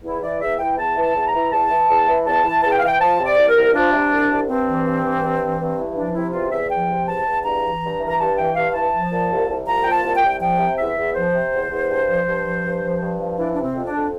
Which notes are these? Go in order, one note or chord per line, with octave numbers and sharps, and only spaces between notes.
E2 E4
E3 D5
E2 E5
E3 G5
E2 A5
E3
A5
E2
A#5
E3
E2 A5
E3
E2
E3
E2 A5
E3
E2 A5
G5
F5
E3 G5
F3 A5
C3
D5
C2
A#4
C2
F3 D4
C3
C2
C2
G2 C4
E3
G2
E3
G2
E3
G2
E3
F3 D4
C3 E4
E2 F4
E2 E5
F3 G5
C3
E2 A5
E2
G2 A#5
E3
G2
E3
A#5
G2 A5
E3 G5
G2 F5
E3 A5
F3
A#2
C2
C2
F3 A#5
A#2 G5
A5
C2
G5
C2
F3 G5
C3
E2 E5
E2
F3 C5
C3
E2
E2
G2
F3
G2
F3
G2
F3
G2
F3
E3 D4
C3 D4
C4
F2
D4
F2